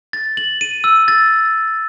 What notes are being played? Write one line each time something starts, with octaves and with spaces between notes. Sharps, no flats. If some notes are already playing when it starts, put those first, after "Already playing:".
A6
F#7
D#7
E6
A6